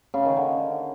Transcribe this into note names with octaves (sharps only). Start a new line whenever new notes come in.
C#3
D#3
D3